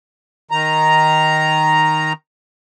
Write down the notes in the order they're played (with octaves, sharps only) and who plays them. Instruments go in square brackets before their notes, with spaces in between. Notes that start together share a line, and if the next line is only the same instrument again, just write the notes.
[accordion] D#3 A#5